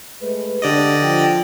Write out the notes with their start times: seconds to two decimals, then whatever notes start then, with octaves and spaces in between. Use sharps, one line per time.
0.21 G#3 A3 B4
0.62 D3 D4 G4 D5 D#5
1.01 F3 G5